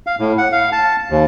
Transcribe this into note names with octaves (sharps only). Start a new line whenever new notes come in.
F5
A2
F#5
F5
A5
D#2